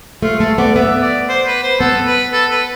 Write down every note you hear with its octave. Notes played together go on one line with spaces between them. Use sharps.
A3 F4
A3 A4
B3 D5
B3 E5
D5
C5
B4
C5
B3 A4
B4
A4
B4